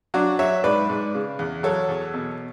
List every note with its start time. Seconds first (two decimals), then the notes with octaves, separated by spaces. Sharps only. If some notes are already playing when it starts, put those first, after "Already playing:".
0.14 F#3 D4 F#4
0.39 F#3 C#5 E5
0.64 G#2 B4 D5
0.90 G#2
1.15 C#3
1.39 E2
1.63 F#3 A4 C#5
1.88 E2
2.14 B2